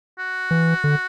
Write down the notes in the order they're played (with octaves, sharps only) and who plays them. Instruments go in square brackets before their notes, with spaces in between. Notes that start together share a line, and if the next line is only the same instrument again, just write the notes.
[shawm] F#4
[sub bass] E3
D3